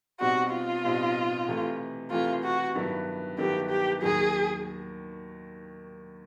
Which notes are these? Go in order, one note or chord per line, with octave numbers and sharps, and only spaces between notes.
B2 G3 C4 D#4 F#4
F4
B2 G3 C4 D#4
C3 E3 A3
C3 E3 A3 F4
F#4
G2 D#3 F#3 B3 E4
G2 D#3 F#3 B3 E4 G4
G4
D#2 D#3 F#3 G#4